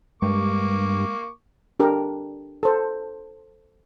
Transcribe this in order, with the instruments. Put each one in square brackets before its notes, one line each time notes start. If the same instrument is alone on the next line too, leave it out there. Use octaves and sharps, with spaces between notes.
[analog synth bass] G2 [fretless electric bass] G#3 [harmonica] A#3 C#6 D6
[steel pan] D4 G4 A#4
A4 C5